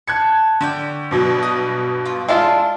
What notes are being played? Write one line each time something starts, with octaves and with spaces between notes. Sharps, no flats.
A5 F#6 G#6 C#7
D3 C#5 D5 G5
G2 B2 F#3
D#5
F4
G#3 D4 F4 E5 A5